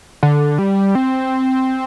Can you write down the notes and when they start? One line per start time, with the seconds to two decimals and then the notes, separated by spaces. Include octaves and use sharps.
0.23 D3
0.59 G3
0.95 C4